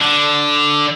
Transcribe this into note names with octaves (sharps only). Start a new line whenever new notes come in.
D3